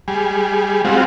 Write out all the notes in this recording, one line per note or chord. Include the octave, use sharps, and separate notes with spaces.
G3 G#4
G3 G#3 C4 F4 F#4